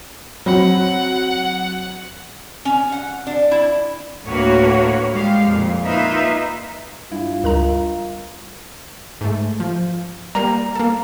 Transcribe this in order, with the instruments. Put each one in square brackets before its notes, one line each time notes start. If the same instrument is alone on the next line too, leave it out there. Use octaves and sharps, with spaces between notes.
[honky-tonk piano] F#3 C4 B5 [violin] F#5
[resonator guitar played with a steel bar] C#4
F#5
D4
E4
[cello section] D2 A2 A#3 F#4 B4 C#5
G3 G#3 G4 F5
F2 A#2
A#3 D#4 F4 B4 E5
[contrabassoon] G2 [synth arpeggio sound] E4 [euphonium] F4
[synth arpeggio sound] C#2 A#5 [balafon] G3 A#4
[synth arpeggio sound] G#2 A3
F3
[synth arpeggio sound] G3 A#3 [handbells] A#5
[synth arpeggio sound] A#3 A4